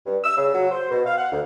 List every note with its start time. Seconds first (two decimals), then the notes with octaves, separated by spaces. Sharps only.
0.06 G2
0.24 E6
0.37 C#3
0.54 F#3
0.71 C5
0.91 B2
1.06 F5
1.18 F#5
1.32 D2